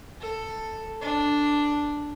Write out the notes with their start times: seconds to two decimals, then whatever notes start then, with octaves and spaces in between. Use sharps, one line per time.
0.20 A4
1.01 D4